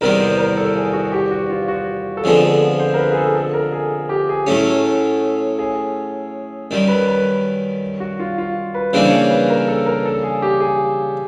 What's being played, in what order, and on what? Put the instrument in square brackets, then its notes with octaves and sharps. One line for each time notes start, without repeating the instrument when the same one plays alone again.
[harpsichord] E2 C3 D#3 G3 B3 [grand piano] A#4
[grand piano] C5
A#4
A4
G#4
F#4
G4
F#4
F4
F#4
A4
[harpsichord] F2 D3 F3 G#3 B3 [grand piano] G#4
[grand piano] C5
A#4
B4
G#4
A4
A4
A#4
G#4
G4
G#4
[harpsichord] A2 F#3 A3 C#4
[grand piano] G#4
[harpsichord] F#2 D#3 G3
[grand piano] B4
B4
F#4
F4
F4
B4
[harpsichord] C#3 E3 G3 A#3 D4 [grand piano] C5
[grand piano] C#5
C5
B4
A#4
A4
A#4
A4
G#4
G4
G#4